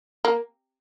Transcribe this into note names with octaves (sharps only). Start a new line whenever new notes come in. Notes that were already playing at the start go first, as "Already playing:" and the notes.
A#3